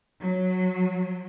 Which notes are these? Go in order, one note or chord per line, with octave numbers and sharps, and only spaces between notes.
F#3